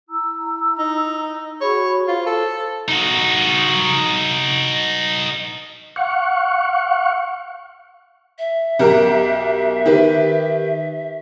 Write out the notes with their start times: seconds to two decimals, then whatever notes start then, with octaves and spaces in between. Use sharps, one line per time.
0.09 E4 A#5 E6
0.79 D#4
1.61 F#4 G#4 C#5 B5
2.08 F4 C5
2.26 A4
2.88 D#4 F#4
5.96 F5 F#5 C#6
8.38 E5
8.79 B1 G4 A#4
9.86 D#3 G4 B4